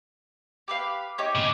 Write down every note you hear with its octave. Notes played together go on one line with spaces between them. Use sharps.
G4 B4 F5
D#4 G4 C#5
A2 C#3